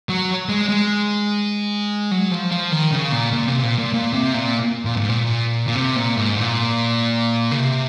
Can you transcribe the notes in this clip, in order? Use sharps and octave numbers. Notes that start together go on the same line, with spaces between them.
F#3
G#3
G#3
F#3
F3
F3
D#3
C#3
A#2
A#2
C3
A#2
A#2
A#2
C3
A#2
A#2
G#2
A#2
A#2
C3
A#2
G#2
A#2
C#3
C3